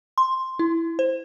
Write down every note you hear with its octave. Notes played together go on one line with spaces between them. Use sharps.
C6
E4
C5